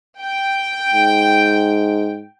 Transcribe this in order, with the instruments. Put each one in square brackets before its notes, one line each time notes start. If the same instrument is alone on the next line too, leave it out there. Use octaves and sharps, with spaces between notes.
[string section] G5
[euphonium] G#2